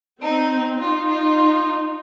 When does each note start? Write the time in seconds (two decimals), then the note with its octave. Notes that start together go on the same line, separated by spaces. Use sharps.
0.22 C4 D#4
0.80 D#4 F4
1.08 F4